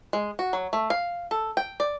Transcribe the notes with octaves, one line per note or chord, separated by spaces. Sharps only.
G#3
F#4
F#3
A3
F5
A4
G5
D5